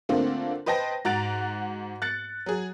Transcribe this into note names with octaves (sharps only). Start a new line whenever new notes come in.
D3 A3 A#3 C4 D4 F4
B4 C5 D#5 G5 A5 A#6
G#2 F#4 A#5 F#6 A6 D7
F#6 A6 C#7
F#3 G#4